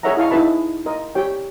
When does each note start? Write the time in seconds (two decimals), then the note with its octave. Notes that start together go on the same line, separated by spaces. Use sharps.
0.03 G#4 A#4 C#5 E5 F#5 A#5
0.17 E4 D#5 F5 A5 C#6
0.31 D#4 E4 G#4 B4 A5 B5
0.86 A#4 D#5
1.15 G4 C#5 G5